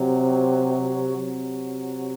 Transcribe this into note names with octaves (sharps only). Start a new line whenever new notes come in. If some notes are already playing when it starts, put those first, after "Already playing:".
Already playing: C3 F#3
C3 F#3